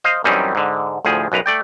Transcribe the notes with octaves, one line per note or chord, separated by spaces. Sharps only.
C5 D#5 F5
F#2 E3 G3 C4 C#4 D#4
G#2 D3
D2 A2 F3 G#4
B1 F#2 B4 A#5
A3 D5 G5